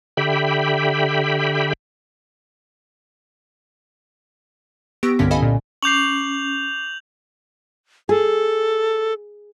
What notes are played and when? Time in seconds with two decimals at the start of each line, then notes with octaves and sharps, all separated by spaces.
0.17 D3 G4 E5 G5 B5
5.03 B3 G4 C#6 E6 A#6 D7
5.19 C2 G2 D3 C#4 B6
5.31 A4 D#5 F5 G#5 B5
5.42 A#2
5.83 C#4 C#6 D6 G6 C7 F7 F#7
8.09 G#4 A4